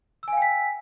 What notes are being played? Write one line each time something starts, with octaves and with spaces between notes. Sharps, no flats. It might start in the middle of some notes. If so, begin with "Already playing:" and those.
F5 G5 G#5 E6 B6